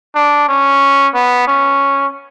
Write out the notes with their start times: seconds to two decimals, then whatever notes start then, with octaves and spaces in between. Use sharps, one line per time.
0.15 D4
0.49 C#4
1.14 B3
1.47 C#4